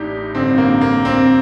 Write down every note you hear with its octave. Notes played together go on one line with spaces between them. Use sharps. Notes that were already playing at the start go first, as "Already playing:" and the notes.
Already playing: A1 A2 D4 D#4 G4
A1 G2 D3 C4
A#3
A#3
C4